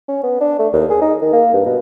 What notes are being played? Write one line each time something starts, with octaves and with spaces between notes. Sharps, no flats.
C#4
B3
D4
A3
D#2
G#4
D#4
D#3
A#3
G2
B2